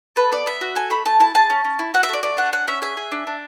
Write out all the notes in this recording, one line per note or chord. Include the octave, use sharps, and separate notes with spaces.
A4 B4
B3 D5
B3 E5
F#4
A4 G#5
A3 B5
A3 A5
E4 A5
G#4 A5
C#4
C#4
E4
F#4 F#5
E5
A3 D5
A3 D5
D4 F#5
C#4 F#5
C#4 E5
G#4 E5
G#4
D4
D4